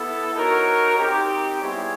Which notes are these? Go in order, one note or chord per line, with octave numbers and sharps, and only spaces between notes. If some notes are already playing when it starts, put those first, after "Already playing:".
Already playing: B3 E4 A4
D#4 F#4 A#4 C#5
C4 D#4 G4
G3 B3 E4 G#4 C#5